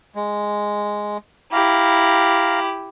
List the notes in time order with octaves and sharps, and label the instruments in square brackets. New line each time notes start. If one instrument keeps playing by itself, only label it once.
[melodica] G#3
[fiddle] E4 G4 [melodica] F5 A#5